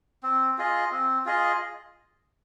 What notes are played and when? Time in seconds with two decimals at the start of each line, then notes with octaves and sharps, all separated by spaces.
0.23 C4
0.58 F4 G#4 D#5
0.91 C4
1.25 F4 G#4 D#5